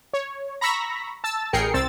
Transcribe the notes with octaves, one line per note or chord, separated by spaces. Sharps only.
C#5
A#5 B5 C#6 E6 A#6 B6
A5 E6 A6
A1 G#4 A#4 G5 C7 C#7
C2 C4 E6 A6